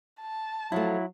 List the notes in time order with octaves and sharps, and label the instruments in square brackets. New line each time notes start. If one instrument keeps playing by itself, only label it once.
[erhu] A5
[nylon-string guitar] F3 A3 [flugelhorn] F#3 [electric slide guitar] E4